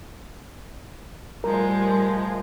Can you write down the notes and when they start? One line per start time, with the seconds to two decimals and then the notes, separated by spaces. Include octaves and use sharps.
1.44 A2 F3 G3 G#3 A#4